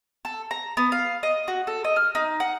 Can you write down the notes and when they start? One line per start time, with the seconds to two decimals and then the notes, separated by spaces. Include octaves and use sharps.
0.25 A4
0.51 A#5
0.77 B3
0.92 F5
1.23 D#5
1.48 F#4
1.67 A4
1.84 D#5
1.96 F6
2.15 D#4
2.40 F#5